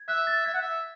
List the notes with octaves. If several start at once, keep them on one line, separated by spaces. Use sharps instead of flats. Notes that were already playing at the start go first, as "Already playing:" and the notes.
Already playing: G#6
E5 F#6
A6
E5 G#6
F#5
E5